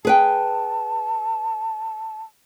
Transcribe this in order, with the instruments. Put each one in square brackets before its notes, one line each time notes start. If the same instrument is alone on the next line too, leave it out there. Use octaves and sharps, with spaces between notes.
[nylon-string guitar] G#4 B4 G5 [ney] A5